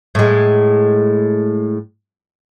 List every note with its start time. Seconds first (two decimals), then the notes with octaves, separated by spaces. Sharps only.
0.15 A2 G#3